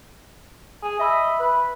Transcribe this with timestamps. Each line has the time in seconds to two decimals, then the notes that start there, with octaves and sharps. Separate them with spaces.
0.83 G#4
0.99 D#5 E5 B5 E6
1.40 B4